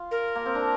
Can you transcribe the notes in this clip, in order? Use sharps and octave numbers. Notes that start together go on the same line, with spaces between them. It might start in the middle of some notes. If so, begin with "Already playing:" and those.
Already playing: F4
A#4
A#3
C4
D4